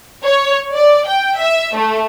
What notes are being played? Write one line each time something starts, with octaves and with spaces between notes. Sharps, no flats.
C#5
D5
G5
E5
A3